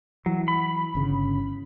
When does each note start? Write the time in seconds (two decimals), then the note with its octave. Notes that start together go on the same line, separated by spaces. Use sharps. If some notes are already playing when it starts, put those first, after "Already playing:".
0.26 E3 F#3
0.48 B5
0.95 G1 C#3